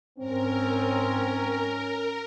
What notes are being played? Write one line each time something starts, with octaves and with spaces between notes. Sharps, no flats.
G#2 C4 C#4 A#4